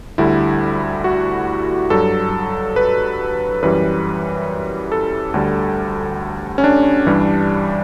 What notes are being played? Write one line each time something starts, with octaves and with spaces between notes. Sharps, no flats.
D2 D3 G3 E4
F#4
G2 F#3 A4
B4
F#2 E3 G3 B4
A4
D2 D3 G3
C#4
D4
G2 E3 G3